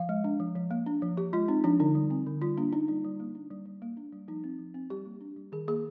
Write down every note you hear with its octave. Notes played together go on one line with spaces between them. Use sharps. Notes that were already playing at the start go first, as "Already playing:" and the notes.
Already playing: F3 F5
G#3
D4
F3
F3
A#3
D4
F3
F3 G4
G#3 F4
C4 D#4
F3 D4
D3 D#4
G3
C4
D3
G3 F4
A#3 D4
D4 D#4
G3 D#4
G3
A#3
D4
G3
G3
A#3
D4
G3
F3 D#4
C4
F3
C4
G3 G4
A#3
D4
G3
D#3 G#4
A#3 G#4